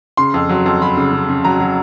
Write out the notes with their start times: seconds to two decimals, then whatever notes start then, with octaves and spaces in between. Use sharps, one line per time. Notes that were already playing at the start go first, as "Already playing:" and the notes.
0.17 C#3 C6
0.34 F2
0.49 F#3
0.66 F2
0.81 F#3 B5
0.97 C#3
1.12 C#3
1.29 C#3
1.44 F#3 A#5
1.60 F#3